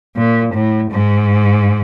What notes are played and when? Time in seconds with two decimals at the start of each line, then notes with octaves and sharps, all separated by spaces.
0.15 A#2
0.54 A2
0.91 G#2